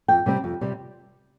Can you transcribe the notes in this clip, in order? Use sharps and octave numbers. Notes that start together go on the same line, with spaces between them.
F2 G5
C3 G3 C4
F2
C3 G3 C4